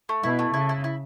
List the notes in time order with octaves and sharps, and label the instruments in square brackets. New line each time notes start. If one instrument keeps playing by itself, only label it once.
[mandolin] A3
[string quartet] B2 [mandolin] E4
[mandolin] A3
[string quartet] C#3 [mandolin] E4
[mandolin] E4
E4